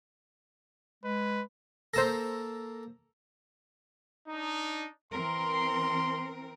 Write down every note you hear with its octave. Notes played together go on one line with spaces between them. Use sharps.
G#3 B4
A#3 A4 C5 E6 A#6
D4 D#4
E3 C4 A#4 C6